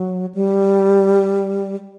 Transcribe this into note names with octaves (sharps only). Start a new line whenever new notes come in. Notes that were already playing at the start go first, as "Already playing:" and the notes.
Already playing: F#3
G3